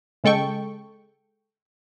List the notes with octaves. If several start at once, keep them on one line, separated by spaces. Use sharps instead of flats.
C#3 G#3 A4 G5 C#6